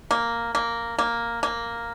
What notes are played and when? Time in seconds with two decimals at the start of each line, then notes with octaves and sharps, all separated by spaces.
0.11 A#3
0.55 A#3
0.98 A#3
1.43 A#3